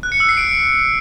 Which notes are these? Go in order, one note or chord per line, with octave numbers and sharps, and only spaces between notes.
F#6
C#7
E6
C7
D7